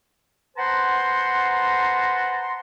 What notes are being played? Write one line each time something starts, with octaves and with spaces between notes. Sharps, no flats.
B4 C5 F#5 A5 A#5 C6